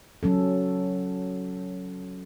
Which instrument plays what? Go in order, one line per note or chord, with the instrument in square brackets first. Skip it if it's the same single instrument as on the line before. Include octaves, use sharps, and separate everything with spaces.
[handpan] F#3 C#4 A4